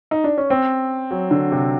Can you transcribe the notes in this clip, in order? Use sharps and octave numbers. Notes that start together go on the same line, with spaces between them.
D#4
D4
C#4
C4
F#3
D3
C3